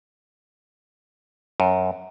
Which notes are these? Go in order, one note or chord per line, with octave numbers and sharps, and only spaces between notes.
F#2